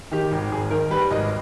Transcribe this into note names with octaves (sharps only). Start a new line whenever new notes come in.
D#3 G4
G#1
G#1 G#4
D#3 A#4
G3 B4
G#1 D#5